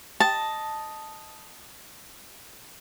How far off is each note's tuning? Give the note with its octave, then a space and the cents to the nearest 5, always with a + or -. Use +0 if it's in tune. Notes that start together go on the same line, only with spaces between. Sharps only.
D#5 +0 A5 +0